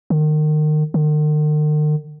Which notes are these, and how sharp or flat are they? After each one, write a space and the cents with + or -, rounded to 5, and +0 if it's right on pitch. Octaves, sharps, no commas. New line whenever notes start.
D#3 -30
D#3 -45